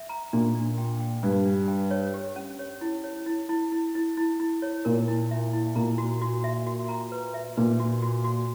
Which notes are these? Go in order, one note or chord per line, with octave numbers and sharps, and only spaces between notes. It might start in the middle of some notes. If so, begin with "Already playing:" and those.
Already playing: E5
A#5
A#2 D4
D4
G5
G5
G2 D4
D4
G5
C#5
G4
C#4
C#5
E4
C#5
E4
E4
E4
E4
E4
E4
C#5
A#2 A#4
E4
E5
E4
A#2 A#5
F#4
F#4
E5
F#4
A#5
B4
E5
A#2 B4
F#4
F#4
F#4